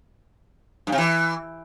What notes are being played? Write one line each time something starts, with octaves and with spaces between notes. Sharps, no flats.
G2
C3
E3